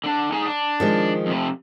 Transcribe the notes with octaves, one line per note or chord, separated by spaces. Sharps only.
D3 D4
D#4 G#4 G#5
D4
D#3 F3 G#3
F2 C3